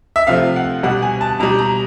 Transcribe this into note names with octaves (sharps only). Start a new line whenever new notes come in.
E5
C3 F3 A3 F5
F#5
B2 G3 F#5
G#5
A5
B2 G3 A#5
A#5